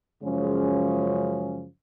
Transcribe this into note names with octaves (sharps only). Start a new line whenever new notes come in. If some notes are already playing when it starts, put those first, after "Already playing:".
F#2 C#3 F3 G#3 C#4